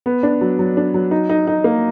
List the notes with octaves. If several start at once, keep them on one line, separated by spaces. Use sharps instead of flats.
B3
D4
F#3
F#3
D4
F#3
D#4
D#4
D#4
A#3